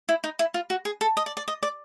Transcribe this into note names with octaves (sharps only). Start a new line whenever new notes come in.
E4
D#4
E4
F4
F#4
G#4
A4
D#5
D5
D5
D#5
D5